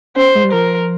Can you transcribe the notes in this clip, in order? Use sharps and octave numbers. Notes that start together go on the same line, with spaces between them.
C#4 C5
G#3
G3
F3 A#4